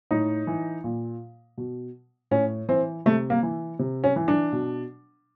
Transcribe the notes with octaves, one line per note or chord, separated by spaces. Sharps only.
A2 D#4
E3
A#2
B2
A2 C#4
E3 C4
C3 A3
A#3
E3
C3
C#4
E3
D4
B2